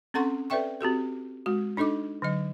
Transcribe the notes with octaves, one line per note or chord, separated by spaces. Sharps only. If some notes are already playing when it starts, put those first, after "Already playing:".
C4 C#4 A4 F#5 C6 C#6
A4 B4 D5 E5 G5 C#6
C4 F#4 G4 A4
G#3 F#4
D4 D#4 A4 D#5 D6
D3 F#3 D#5